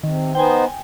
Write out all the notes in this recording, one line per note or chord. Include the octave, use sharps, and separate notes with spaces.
C3 D#3
B3 D#4 C5 G5 G#5